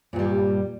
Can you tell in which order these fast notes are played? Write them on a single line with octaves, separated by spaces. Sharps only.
A#2 G2 G3